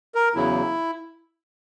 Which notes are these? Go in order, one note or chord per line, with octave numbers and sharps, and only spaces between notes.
A#4
E2 C#3 F#3 E4